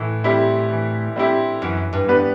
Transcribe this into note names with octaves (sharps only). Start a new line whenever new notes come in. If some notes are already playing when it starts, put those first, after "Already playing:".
Already playing: A2 E3
G3 C4 E4 G4
E3
G3 C4 E4 G4
F#2 E3
G2
B3 D4 G4 B4